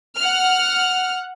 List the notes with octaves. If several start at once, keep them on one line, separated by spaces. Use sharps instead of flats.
F#5 F6